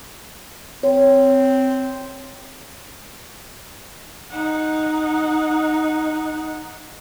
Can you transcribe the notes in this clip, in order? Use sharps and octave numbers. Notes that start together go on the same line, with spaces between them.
C4 C#5
D#4 F#5